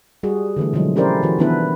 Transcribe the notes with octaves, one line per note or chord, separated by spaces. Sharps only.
G3 F#4 G#4
D3 E3 A3
B2 D3 F3 F#3 G#3
C#4 E4 G4 A#4 C5 D5
E3 F#4
D#3 F3 B3 D4 E4 B4